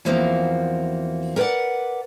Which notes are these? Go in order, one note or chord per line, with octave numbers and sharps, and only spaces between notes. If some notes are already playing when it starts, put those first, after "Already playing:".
E2 E3 F3 A#3 C4 F#4
A#4 B4 C#5 D5 F#5